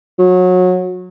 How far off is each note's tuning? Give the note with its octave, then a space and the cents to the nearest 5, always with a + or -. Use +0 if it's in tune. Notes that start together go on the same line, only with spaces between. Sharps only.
F#3 -25